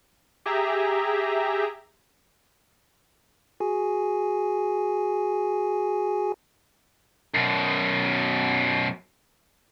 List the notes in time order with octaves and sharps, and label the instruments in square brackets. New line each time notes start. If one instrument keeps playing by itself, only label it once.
[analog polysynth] G4 G#4 E5 A#5
[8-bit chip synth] F#4 G#4 G#5
[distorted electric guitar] F#2 B2